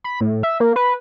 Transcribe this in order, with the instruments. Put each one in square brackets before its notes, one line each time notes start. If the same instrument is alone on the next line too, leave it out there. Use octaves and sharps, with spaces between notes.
[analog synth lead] B5
A2
E5
A#3
B4